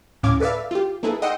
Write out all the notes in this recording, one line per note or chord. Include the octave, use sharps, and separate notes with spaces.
D2 A2 C#4 F5 D6 G#6
A4 B4 D5 E5 F5
F4 G4
A#3 D#4 E4 G#4 A4 B4
D#5 F#5 G5 C6 E6 C#7